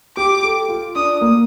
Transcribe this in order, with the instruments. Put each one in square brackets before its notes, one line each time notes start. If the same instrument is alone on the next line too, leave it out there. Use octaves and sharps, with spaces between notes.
[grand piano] G4 [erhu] D6
[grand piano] A4
F4
[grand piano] D4 [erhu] D#6
[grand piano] A#3